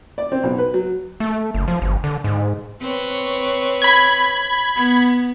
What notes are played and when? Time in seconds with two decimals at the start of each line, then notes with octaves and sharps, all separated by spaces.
0.18 D5
0.32 C4
0.43 B1
0.58 B4
0.74 F#3
1.20 A3
1.55 F#1
1.68 F3
1.82 G1
2.04 D3
2.24 G#2
2.82 C4 B4 C#5
3.82 B5 G#6
4.76 B3